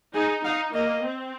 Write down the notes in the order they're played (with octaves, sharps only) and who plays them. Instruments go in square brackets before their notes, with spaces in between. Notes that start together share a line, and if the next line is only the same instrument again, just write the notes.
[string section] D#4 [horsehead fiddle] G#4
[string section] D#4 [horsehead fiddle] F5
[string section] A#3 [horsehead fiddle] D#5
[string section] C4